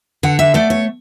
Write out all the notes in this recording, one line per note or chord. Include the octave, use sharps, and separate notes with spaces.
D3 F#5
E5
A3 D5
C#5